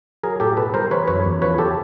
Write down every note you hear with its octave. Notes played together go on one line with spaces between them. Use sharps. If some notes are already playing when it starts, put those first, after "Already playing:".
F#3 G#4 A#4
A2 G4 A4
B2 A4 B4
G3 A#4 C5
E3 B4 C#5
F#2 B4 C#5
E2
F3 B4 C#5
C#3 G4 A4